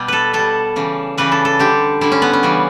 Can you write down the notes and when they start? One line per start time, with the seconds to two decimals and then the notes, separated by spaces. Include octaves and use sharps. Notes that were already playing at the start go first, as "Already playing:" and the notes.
Already playing: B2 G3
0.08 A4 B4
0.33 B2 G3 A4
0.76 C#3 E3 G3
1.18 C#3 E3 G3 B4
1.32 A4
1.45 A4
1.59 D3 G3 G4
2.01 D3 G3 E4
2.12 C#4
2.22 B3
2.33 C#4
2.43 C#3 E3 G3